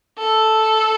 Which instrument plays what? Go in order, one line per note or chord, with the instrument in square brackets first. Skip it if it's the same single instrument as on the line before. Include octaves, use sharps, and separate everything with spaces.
[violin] A4